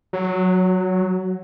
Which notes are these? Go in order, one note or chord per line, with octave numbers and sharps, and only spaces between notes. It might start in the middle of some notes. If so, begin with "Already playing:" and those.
F#3